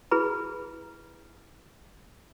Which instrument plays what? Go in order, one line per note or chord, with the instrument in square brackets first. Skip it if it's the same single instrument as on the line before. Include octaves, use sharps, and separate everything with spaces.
[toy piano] E4 G#4 B4 B5